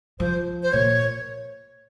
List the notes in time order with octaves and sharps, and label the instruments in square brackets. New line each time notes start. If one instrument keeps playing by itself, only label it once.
[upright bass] F3 [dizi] C5
[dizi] C5
[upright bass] A#2 [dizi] C#5